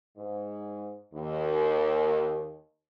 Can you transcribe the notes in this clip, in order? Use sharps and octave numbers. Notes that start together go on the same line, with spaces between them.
G#2
D#2